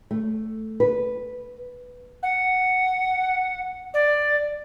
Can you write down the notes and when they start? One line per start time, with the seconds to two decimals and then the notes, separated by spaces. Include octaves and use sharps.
0.11 A3
0.80 B4
2.23 F#5
3.94 D5